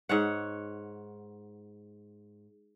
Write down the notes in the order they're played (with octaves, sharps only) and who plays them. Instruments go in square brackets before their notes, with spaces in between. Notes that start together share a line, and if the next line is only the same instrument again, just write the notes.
[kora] G#2 C#5 F#5